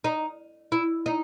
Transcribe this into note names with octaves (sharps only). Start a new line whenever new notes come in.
D#4
E4
D#4